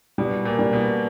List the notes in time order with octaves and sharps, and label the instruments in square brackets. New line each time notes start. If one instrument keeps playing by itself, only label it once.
[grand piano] B2 [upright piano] G3
[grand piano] A#2
[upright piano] G3
[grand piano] B2